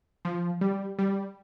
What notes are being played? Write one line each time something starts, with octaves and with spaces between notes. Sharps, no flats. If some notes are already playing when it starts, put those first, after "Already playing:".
F3
G3
G3